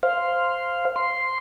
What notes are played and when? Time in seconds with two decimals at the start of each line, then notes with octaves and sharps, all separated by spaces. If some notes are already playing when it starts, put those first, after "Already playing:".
0.03 C5 F5
0.96 C6